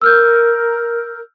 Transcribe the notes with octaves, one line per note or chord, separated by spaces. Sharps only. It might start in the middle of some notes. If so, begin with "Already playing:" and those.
A#4 E6 F6 G6